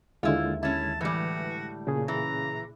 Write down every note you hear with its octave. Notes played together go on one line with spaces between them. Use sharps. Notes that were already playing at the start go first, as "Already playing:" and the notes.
D#2 D3 G#3 E4 F4
C#4 E4 A5
A2 E3 G3 F#4
A#2 C#3 G#4
E3 A#5